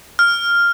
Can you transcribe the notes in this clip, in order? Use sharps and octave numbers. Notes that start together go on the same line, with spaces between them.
F6